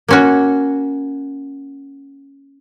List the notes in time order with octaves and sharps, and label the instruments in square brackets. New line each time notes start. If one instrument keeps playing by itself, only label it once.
[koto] A#3 C#4 F#4